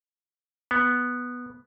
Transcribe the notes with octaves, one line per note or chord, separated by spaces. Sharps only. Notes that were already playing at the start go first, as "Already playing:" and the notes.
B3